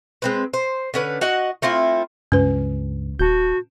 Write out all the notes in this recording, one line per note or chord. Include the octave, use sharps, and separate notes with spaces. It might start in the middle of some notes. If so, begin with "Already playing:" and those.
G#3 C4 B4
C5
D3 C#4 B4
F#4 D#5 F#5
A3 C4 E4 F4
C#2 G2 C#4 B4
D#1 F#4 A5 G6